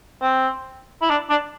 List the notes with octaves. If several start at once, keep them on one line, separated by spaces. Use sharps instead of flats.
C4
E4
D4
D4